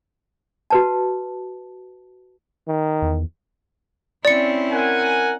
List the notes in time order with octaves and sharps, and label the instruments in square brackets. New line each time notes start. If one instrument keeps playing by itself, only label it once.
[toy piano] F#4 B4 A5
[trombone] D#3
[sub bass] E2
[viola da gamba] C4 C#4 E4 [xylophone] D5 C#7
[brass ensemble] A#4 F#5 G#5